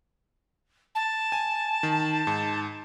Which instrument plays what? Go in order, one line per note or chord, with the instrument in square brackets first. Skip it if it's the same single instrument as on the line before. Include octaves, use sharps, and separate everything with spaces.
[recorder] A5
[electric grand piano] G#5
D#3
G#2